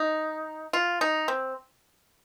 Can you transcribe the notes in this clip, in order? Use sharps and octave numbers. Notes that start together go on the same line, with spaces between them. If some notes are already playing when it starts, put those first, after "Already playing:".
Already playing: D#4
F4
D#4
C4